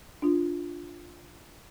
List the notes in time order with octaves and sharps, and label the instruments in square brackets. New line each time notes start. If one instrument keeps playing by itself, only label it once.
[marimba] D4 F4